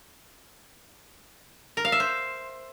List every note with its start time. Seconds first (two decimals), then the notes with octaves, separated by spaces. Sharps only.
1.77 A#4
1.85 F5
1.92 E5
2.00 C5